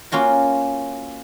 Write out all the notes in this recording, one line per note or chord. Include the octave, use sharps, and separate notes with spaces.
A#3 C#4 F4 F#4